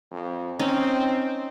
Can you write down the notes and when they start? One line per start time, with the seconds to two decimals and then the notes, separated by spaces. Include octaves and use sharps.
0.11 F2
0.59 C4 C#4 D#4